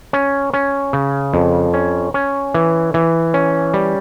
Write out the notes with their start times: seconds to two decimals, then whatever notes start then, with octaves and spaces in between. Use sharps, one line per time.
0.13 C#4
0.54 C#4
0.93 C#3
1.34 F2
1.74 C#4
2.14 C#4
2.54 E3
2.94 E3
3.34 C#4
3.74 G3